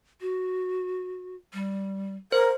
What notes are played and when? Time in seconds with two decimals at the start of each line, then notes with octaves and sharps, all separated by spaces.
0.21 F#4
1.54 G3
2.32 A#4 C5